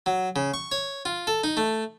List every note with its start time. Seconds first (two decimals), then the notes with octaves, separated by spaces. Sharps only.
0.06 F#3
0.36 C#3
0.54 C#6
0.72 C#5
1.05 F4
1.27 A4
1.44 D#4
1.57 A3